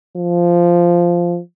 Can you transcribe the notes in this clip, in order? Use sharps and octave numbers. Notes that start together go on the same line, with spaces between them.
F3